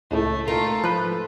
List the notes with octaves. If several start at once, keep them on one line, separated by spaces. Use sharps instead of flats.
C#2 A2 A3
A3 D#4 F4 A4 A#4
G#2 F3 A4 B4